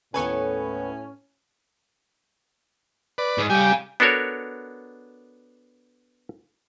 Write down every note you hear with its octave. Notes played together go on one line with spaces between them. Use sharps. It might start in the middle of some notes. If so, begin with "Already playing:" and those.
D#2 A2 B3 C#4 A4 B4 C#5 G#5
B4 D5
G#2
G3 G4 F5 G#5
B3 D4 F#4 A4 A#4 C#5